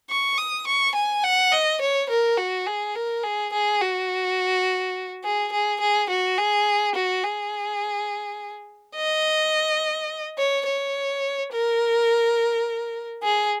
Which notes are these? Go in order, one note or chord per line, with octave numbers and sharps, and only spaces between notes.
C#6
D#6
C#6
G#5
F#5
D#5
C#5
A#4
F#4
G#4
A#4
G#4
G#4
F#4
G#4
G#4
G#4
F#4
G#4
F#4
G#4
D#5
C#5
C#5
A#4
G#4